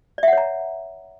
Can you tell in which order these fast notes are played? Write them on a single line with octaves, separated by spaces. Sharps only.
D5 E5 F#5 C#5 A#5